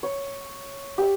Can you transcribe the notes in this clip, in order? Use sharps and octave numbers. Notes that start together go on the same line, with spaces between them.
C#5
G4 E5